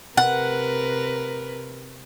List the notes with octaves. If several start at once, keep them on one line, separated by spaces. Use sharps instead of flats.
C3 A#4 B4 F#5